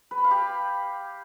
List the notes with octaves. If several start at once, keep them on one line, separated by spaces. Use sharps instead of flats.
B4
B5
F5
G4